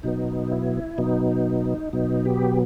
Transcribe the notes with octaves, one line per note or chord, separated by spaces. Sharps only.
B2 F#3 B3 D#4
E4
B2 F#3 B3 D#4
B2 F#3 B3 D#4
G4